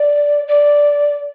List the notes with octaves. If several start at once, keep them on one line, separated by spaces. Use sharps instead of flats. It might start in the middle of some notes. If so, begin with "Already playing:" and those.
Already playing: D5
D5